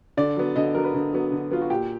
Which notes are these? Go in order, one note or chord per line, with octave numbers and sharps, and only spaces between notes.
D3 D5
F#3 B3
D3 D#5
F#3 B3 A#4
B4
D3
F#3 B3
D3
F#3 B3 F4
F#4
A#2 G4